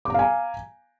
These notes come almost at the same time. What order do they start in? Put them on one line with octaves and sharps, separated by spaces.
D6 A#5 F5 G#5